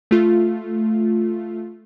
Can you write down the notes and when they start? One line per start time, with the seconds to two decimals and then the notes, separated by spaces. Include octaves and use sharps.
0.11 A3 F4